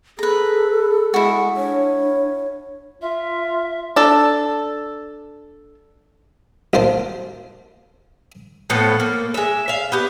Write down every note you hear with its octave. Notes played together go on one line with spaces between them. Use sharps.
G#4 A4 B4 A#5
G#3 E4 F#4
D4 C#5
F4 E5
D4 A4
B1 A#3 C5 A5
A2 F3 B3 A4
A#3
G#3 E5
E5 F5
B3 G4